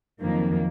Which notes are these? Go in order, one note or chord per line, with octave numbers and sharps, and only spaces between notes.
F2 D#3 F#3 A#3